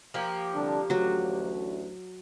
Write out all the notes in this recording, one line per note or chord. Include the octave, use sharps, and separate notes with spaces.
F3 A#3 G4
C2 D3 D4
A1 D2 F#3 F#4